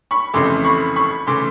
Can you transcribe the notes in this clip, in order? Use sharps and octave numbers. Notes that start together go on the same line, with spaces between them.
B5 C#6
F2 C#3 E3 A3 C6 D6
B5 C#6
B5 C#6
C#3 E3 A3 C6 D6